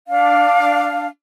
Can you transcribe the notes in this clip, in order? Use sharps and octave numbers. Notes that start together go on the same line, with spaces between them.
D4 F5